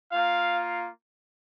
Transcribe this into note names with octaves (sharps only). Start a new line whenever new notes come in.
A#3 F4 F5